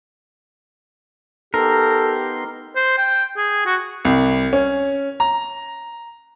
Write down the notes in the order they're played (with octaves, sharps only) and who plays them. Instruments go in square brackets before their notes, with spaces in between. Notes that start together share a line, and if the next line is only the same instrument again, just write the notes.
[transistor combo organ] B3 D#4 C6 [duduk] G4 [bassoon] A4 [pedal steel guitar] A#4
[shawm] C5
G5
G#4
F#4
[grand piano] C2
C#4
A#5